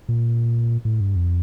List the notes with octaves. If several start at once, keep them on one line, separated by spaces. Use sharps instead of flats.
A#2
A2
G2
F2